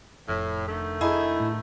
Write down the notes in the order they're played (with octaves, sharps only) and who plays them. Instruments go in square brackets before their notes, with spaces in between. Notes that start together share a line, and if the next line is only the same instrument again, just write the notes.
[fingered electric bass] F1 [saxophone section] A2
[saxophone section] D3 D#3 A3
[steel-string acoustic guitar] D#4 E4 G#4
[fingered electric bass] A2